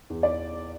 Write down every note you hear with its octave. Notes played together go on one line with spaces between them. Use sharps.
E2
D5